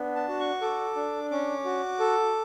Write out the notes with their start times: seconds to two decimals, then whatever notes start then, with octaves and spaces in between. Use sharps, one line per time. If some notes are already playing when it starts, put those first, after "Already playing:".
Already playing: B3 D4
0.16 A5
0.28 F#4
0.40 C#6
0.61 A4 D6
0.96 D4
1.31 C#4 D6
1.65 F#4
1.99 A4